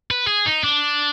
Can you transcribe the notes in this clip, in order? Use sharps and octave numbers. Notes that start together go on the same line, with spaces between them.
B4
G#4
D#4
D4